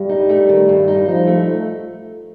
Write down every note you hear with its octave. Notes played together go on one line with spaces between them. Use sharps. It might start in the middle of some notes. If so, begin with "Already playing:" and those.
Already playing: G2 G3
D#4
A3
D#3
G2
D#4
F3 D#4
A3